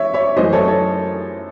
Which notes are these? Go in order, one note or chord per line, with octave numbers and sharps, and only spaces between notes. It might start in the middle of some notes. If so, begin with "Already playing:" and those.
Already playing: E3 C#5 E5
C#5 E5
F#2 E3 A3 C5 D#5
A4 C#5
A4 C#5